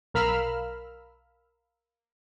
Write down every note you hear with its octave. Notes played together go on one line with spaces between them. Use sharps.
B1 A#4 F5 B5 E6 F6